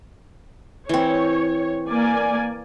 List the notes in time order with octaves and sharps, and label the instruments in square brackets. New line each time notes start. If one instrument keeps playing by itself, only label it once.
[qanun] E3 C4 [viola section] C#5
[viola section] A#3 D5 G#5